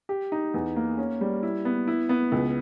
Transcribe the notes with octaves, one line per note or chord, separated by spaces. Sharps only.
G4
D#4
E2
A#3
C#4
G3
E4
B3
E4
B3
C#2